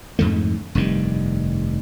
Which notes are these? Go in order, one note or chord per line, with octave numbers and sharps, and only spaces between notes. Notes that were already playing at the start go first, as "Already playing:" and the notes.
F2 G#2 D3 A3
F1 G2 D#3 G3